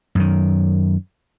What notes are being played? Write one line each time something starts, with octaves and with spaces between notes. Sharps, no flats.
F#2 D#3